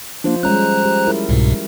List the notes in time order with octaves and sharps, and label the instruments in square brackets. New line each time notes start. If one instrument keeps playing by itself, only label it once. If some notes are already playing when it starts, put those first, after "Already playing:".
[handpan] F3 F4 C5 [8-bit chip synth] A#3 D4
[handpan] G3 G#3 C#4 [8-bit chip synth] C5 A#5 F#6
[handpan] G4
E4 A#4
[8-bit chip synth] C2 G#2 B2